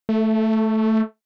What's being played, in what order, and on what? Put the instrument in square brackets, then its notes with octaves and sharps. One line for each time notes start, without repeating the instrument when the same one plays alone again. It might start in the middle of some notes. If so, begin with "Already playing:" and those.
[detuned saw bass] A3